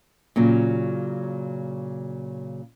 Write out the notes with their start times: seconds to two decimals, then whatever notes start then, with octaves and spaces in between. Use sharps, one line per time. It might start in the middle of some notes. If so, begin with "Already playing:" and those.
0.36 A#2 C#3 F#3